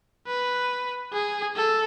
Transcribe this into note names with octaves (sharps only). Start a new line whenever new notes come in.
B4
G#4
A4